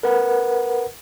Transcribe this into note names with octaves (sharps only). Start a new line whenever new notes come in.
A#4 B4 F#5